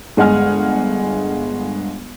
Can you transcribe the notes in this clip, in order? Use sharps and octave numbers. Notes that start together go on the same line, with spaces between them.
G1 G#3 D#5 F#5 G#5 F6